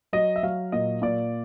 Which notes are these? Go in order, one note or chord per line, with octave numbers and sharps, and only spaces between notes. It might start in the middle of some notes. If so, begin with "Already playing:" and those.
F#3 D#5
E5
F#3 F5
A#2 D#5
A#2 D5